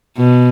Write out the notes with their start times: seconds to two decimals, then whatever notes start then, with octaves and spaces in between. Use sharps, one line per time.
0.18 B2